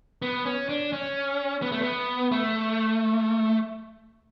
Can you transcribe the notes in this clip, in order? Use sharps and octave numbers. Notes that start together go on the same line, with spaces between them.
B3
C#4
D4
C#4
B3
A3
B3
A3